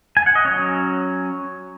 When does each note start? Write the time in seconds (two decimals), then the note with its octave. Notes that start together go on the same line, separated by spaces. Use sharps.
0.17 G#5
0.26 F#5
0.35 D#5
0.45 F#3 C#4 C#5